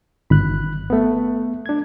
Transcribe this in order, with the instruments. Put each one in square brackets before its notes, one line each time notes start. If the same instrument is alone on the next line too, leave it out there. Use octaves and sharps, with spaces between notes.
[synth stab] G#1 [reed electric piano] B5 F#6
[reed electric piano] A3 B3
D4 G#6